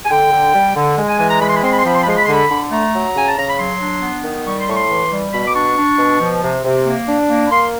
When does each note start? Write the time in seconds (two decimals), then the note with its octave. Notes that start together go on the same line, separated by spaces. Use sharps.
0.05 G#5
0.10 D3 G5
0.32 D3
0.54 G3
0.75 D3
0.97 G#3
1.08 G#5
1.19 E3 G#5
1.30 A#5
1.41 G#3 B5
1.49 C6
1.56 B5
1.63 C4 C6
1.71 B5
1.79 C6
1.85 F3 B5
1.95 C6
2.02 B5
2.06 G#3 C6
2.17 B5
2.24 C6
2.28 D3 B5
2.50 D3
2.71 A3 A#5
2.93 F#3
3.15 C#3 G#5
3.28 A5
3.37 C#3 A#5
3.48 B5
3.59 F#3 C6
3.80 D4
4.02 B3
4.24 D#3
4.46 G3 C#6
4.61 C6
4.68 A2 C#6
4.75 C6
4.89 E3
5.12 G3
5.33 B2 B5
5.47 D6
5.55 D4 C#6
5.77 D4
5.98 B2
6.21 F3
6.43 C3
6.64 C3
6.86 A#3
7.08 D4
7.29 A#3
7.47 B5
7.51 A#3 C6